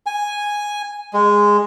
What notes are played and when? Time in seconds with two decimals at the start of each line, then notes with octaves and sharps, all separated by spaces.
0.06 G#5
1.14 G#3